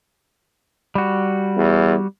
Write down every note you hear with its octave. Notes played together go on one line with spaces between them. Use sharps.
G3 F#4
E2